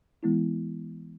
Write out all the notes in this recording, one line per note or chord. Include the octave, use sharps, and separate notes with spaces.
E3 G#3 B3 E4